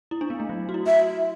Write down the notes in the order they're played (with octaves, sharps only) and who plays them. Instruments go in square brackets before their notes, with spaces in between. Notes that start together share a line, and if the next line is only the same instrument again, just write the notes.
[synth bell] E4
D4
B3
A3
F#3
F#4
E4
[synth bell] F#4 [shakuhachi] E5